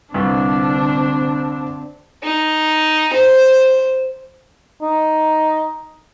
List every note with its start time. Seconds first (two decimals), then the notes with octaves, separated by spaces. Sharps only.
0.14 C2 G2 D3 C4 D4
2.23 D#4
3.13 C5
4.82 D#4